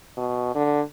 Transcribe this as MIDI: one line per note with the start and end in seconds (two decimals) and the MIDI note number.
0.17 0.52 47
0.55 0.81 50